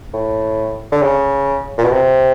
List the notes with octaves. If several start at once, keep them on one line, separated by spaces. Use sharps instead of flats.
A2
D3
C#3
A#2
B2
C3